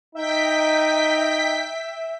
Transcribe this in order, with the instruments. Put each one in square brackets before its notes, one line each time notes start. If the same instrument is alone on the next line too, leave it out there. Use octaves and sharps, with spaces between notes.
[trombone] D#4 [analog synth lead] E5 [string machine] G5 B6